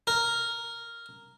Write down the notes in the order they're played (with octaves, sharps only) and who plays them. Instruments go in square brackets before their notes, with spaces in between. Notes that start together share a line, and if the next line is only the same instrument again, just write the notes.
[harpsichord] A#4